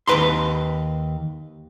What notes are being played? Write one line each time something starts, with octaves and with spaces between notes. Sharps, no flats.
D#2 C#3 B4 A#5 C6